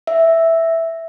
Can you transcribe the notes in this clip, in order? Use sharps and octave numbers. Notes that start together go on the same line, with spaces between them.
E5